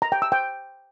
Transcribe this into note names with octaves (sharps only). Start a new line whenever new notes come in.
A#5
G5
E6
G5